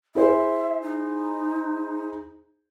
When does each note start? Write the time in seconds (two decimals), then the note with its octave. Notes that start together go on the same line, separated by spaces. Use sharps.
0.15 E4 G#4 C5 E5
0.82 D#4